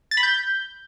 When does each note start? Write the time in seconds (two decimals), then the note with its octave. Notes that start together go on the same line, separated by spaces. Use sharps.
0.11 A6
0.17 B5
0.23 G6